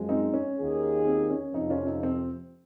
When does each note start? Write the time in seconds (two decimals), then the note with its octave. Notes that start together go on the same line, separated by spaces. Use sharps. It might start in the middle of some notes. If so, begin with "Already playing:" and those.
Already playing: F#2 F3 G#3
0.09 C4 D#4
0.34 C#4
0.58 D#2 D#3 A#3 F4 G#4
1.06 C4
1.30 C#4
1.54 F2 C3 F3 C4 D#4
1.70 C#4 F4
1.86 C4 D#4
2.03 C4